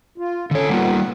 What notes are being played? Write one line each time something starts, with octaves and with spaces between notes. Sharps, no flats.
F4
D3 C#4 A4 C#5
G3 A#3 B3 F4 F#5